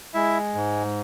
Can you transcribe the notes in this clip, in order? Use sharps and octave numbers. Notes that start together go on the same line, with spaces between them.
G#3 E4 E5
G#2